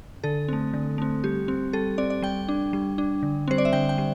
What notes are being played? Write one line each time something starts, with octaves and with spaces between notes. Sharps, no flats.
D3 A4
A3 C4
D3
A3 C4
G3 G4
C4
G3 A4
C4 D5
D5
G3 G5
D4
G3
D4
D3
G3 C4 C5
D5
E5
D3 G5
G5
G3